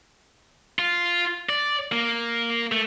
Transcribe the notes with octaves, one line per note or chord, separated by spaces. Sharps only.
F4
D5
A#3
A3